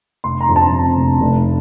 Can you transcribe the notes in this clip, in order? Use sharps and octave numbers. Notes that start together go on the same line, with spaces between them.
F1 C6
A#5
F2
A5
C3
F1
F1